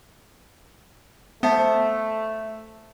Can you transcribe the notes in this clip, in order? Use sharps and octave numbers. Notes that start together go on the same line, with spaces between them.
A3 B3 C5 E5 A5